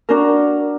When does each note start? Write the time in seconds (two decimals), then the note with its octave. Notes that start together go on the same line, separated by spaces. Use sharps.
0.09 D4 F#4 A#4